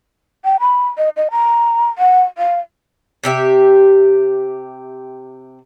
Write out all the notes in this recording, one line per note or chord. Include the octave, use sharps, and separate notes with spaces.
G5
B5
D#5
D#5
A#5
F#5
F5
C3 G4 E5